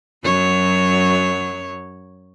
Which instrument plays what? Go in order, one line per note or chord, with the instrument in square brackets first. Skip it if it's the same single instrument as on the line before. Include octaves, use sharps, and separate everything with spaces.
[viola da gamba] F#2 F#3 C#5